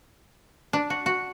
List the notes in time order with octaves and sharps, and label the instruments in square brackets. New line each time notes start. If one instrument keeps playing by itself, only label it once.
[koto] D4
F#4
F#4